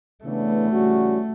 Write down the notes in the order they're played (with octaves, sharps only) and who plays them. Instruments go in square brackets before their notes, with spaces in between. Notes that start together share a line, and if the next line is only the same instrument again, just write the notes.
[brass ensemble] C#3 E3 B3 D4 [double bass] A3
[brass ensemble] C#3 E3 G3 C#4 F#4